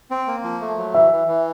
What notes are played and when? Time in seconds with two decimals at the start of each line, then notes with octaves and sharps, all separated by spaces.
0.11 C4
0.27 A#3
0.44 F3
0.61 A3
0.78 F#3
0.94 E3 E5
1.12 E3
1.28 E3